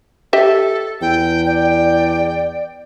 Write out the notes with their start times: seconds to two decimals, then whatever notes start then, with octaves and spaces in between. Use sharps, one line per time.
0.33 G4 A4 D#5 E5
1.01 E2 G5
1.46 D5 G5